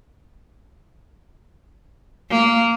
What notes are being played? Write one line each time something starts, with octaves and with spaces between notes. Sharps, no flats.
A#3